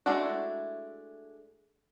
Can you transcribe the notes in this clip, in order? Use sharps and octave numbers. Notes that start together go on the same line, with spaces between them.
G#3 A3 D4 E4 F#4